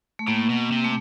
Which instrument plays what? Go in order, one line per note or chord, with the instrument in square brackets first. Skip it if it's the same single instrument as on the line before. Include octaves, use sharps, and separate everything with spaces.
[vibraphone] A3
[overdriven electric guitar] A2 [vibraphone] A#3
[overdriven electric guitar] B2
C3
[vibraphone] A3